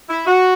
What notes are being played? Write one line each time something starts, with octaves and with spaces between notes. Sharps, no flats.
E4
F#4